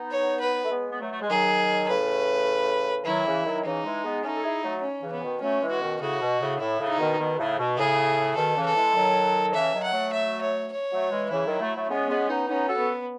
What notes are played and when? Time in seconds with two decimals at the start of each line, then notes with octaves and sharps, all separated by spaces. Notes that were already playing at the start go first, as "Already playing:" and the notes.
Already playing: B3 D#4
0.11 C#5
0.41 B4
0.64 A3
0.70 G#3 B3
0.92 B3
1.00 F#3 A3
1.12 A3
1.21 G#3
1.29 D#3 F#3 G#4
1.89 A2 C#3 B4
3.06 D#3 F#3 E4
3.26 C#3 E3
3.45 D#3 F#3
3.65 C#3 E3 D#4
3.85 E3 G#3
4.04 G#3 B3
4.23 A3 C#4 D#4
4.36 A4
4.43 E4 G#4
4.63 F#3 A3
4.82 C#4
5.02 C#3 E3
5.13 B3
5.22 B2 D#3
5.41 F#3 A3 C#4
5.61 E3 G#3
5.71 F#4
5.81 B2 D#3
6.00 A2 C#3 F#4
6.21 B2
6.40 A2 C#3
6.60 A2 E4
6.79 A2 C#3
6.90 D#4
6.99 B2 D#3
7.18 B2 D#3
7.38 A2 C#3
7.58 B2
7.77 A2 C#3 G#4
8.36 B2 D#3 A4
8.55 C#3 E3
8.66 A4
8.75 E3 G#3
8.95 D#3 F#3
9.54 C#3 E3 E5
9.73 D#3 F#3
9.83 F#5
9.93 F#3 A3
10.13 E5
10.42 C#5
10.72 C#5
10.91 F#3 A3
11.11 E3 G#3
11.31 C#3 E3 E4
11.45 D#3 F#3
11.60 F#3 A3
11.75 F#3 A3
11.89 G#3 B3 C#4
12.09 G#3 B3
12.28 B3 D#4
12.48 B3 C#4 D#4
12.68 F#4 A4
12.77 B3